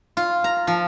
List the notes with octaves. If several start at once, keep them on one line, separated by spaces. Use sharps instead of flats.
F4
A#5
F3